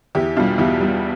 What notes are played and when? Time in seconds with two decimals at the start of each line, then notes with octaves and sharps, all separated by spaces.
0.15 E2 E4 G4
0.37 B2 G3 D4 F4
0.58 E2 E4 G4
0.80 B2 G3